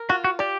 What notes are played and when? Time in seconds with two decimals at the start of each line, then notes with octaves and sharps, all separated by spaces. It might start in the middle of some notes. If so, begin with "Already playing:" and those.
Already playing: A#4
0.09 F4 F#4
0.24 F#4
0.39 G4 D5